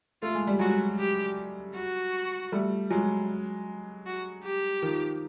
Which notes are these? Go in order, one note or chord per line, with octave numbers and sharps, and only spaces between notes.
A3 F4
G#3
G3
F#3 G#3 F#4
G4
F#4
G3 A3
F#3 G#3
F#4
G4
D#3 F3